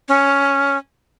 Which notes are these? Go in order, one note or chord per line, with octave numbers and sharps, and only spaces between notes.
C#4